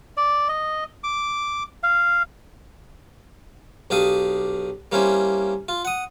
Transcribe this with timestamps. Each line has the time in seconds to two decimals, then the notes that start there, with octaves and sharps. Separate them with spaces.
0.17 D5
0.49 D#5
1.04 D6
1.83 F5
3.90 B1 D4 G4 F5 D#6
4.92 G3 A#3 C#4 E4 C5
5.69 F4
5.85 F#5 D#6